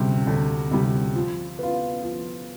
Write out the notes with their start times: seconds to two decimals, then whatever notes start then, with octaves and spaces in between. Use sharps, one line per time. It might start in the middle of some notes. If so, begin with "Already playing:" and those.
Already playing: D2 C3 G3
0.27 D2
0.71 C3 G3
1.15 F3
1.59 B3 F4
2.03 F3